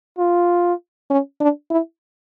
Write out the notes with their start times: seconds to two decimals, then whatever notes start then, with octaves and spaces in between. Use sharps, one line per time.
0.19 F4
1.10 C#4
1.40 D4
1.70 E4